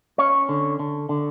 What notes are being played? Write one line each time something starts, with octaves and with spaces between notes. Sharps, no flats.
C#4 C#5
D3
D3
D3